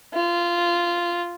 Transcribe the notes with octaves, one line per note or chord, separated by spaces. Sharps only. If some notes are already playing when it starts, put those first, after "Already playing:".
F4